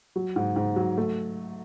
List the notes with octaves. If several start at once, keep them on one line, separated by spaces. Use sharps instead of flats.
F#3
G#2
G#2
F#3
A3